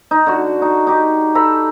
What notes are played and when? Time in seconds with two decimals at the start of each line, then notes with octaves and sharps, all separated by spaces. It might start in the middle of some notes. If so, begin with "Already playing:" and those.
0.11 D#4
0.26 D3 F#4
0.62 D#4
0.87 D#4 G4
1.35 A4 A#5 B5